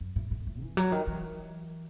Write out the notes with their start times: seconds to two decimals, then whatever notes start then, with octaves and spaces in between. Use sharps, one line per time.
0.01 F#2
0.16 A2
0.31 A2
0.47 A2
0.61 E3
0.77 F#3
0.92 D#3
1.07 E3